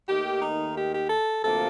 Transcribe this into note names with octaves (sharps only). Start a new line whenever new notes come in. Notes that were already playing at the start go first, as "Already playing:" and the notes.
D#2 D#3 A3 G4
D#4
G4
G4
A4
D2 C3 F3 A#3 A4